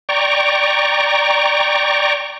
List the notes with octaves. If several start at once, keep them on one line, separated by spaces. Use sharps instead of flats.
D5 G5 A#5 C#6